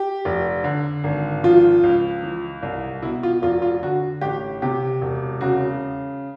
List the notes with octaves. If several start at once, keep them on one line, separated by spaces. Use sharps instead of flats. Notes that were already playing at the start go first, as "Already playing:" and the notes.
Already playing: G4
F1
D3
G#1
F3 F4
C#2
E3
C2
B2 E4
F4
F1 F4
F4
D3 F#4
A1 G4
C3 G4
E1
C#3 F#4